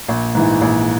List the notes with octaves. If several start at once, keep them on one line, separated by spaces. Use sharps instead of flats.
A#1
G#2 E3
A#1